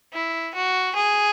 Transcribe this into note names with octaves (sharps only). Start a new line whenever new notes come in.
E4
F#4
G#4